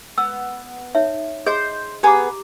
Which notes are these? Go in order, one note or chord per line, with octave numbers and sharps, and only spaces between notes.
B3 E6
D#4 C#5 E5
G#4 C5 D#5 G6
B3 G4 G#4 B4 A#5 D6